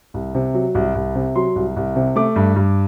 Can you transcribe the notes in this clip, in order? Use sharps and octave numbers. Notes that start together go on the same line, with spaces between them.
C2
C3
F#3
C2
C2
C3
F#3 C6
C2
C2
C3
A3 D6
G2
G2